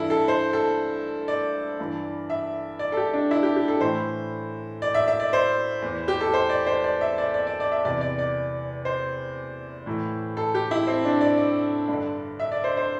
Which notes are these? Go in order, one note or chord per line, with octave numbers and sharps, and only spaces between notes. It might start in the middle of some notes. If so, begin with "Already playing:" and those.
Already playing: G2 E3 E4 A4
A4
C5
A4
D5
G2 E3
E5
D5
A4
G4
D4
E4
G4
G4
A4
A2 E3 C5
D5
E5
E5
D5
C5
E2 E3
G4
A4
C5
D5
C5
D5
E5
D5
D5
D5
D5
E5
E2 C3 E3 D5
D5
D5
C5
A2 E3
A4
G4
E4
C4
D4
D5
D5
G2
D3
E5
D5
C5
C5